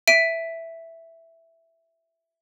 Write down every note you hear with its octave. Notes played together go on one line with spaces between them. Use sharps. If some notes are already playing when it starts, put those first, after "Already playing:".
E5 B6 D7 D#7